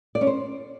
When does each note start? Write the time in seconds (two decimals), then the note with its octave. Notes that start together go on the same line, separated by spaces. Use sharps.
0.15 D5
0.21 C#4
0.27 C5